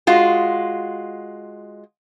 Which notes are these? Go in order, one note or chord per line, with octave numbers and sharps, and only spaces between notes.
G#3 F4 F#4